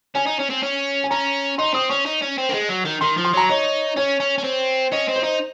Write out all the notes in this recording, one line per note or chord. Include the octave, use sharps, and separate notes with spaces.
C#4 G#5
D#4
C#4
C4
C#4
G#5
C#4 A#5
D#4 C6
C4 D#6
C#4 C#6
D#4
C#4
C4
A#3
G#3
F#3
D#3
D#3 C6
F3
C6
F#3 A#5
D#4 C#5
C#4 C#5
C#4
C#4
C4
C#4 D#5
C4
C5
D#4